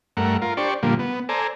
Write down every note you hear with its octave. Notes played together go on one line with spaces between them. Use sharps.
G2 A3 A#4 F#5
F4 A#4
D4 G4 C5 D5 C#6
A#2 D3 F3 G3 A#3
B3
A4 C5 D5 G#5 A#5